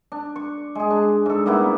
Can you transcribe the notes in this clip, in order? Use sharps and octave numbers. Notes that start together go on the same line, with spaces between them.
D4
C#6
G#3 G#4
D4
G#2 A4
G3 A#3 B3 E4